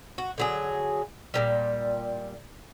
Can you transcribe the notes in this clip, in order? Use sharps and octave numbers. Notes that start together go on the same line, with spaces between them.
F#4
D3 F#3 G#4
A#2 D#3 G3